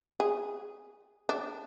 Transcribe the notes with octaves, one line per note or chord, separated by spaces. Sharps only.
G#4
D4